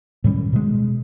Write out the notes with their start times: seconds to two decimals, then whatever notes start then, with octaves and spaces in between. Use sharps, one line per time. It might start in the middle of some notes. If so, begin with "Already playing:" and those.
0.24 A2 D#3 G3 C#4
0.53 B2 G#3